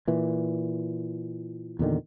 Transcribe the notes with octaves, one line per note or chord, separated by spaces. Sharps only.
A#2 E3
E2 A#2 D3 D#3